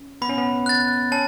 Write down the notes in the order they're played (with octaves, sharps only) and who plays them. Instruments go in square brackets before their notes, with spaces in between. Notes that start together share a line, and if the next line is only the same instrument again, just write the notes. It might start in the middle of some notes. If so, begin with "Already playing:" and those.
Already playing: [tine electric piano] C#4
[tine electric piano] B3 [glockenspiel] B5
[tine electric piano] C#4
B3
[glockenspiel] F#6 A6
[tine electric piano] C#4 [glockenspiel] A5